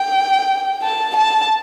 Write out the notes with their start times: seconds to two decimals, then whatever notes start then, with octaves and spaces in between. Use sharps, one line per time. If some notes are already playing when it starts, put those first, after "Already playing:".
Already playing: G5
0.82 A5
1.16 A5